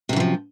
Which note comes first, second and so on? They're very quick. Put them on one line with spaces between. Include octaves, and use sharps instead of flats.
C3 F#2 E3 F3